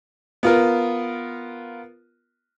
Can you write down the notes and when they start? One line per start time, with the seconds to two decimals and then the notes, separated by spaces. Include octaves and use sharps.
0.43 B3 F4 A#4